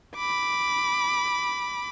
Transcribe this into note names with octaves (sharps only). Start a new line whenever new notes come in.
B5 D6